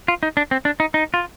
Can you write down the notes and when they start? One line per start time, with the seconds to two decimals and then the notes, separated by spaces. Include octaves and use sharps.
0.08 F4
0.23 D#4
0.37 D4
0.51 C4
0.65 D4
0.80 D#4
0.94 D#4
1.14 F4